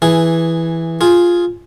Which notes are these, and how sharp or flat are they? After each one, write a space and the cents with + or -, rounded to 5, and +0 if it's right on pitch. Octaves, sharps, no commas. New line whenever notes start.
E3 +0 G#4 +0
F4 +0 G#4 +0